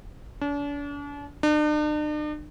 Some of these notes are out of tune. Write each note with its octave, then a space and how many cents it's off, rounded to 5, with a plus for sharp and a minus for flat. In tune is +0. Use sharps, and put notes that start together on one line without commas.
D4 -40
D4 +45